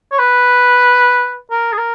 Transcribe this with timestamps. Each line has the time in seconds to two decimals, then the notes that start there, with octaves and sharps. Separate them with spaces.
0.12 C#5
0.19 B4
1.51 A#4
1.72 G#4
1.78 A#4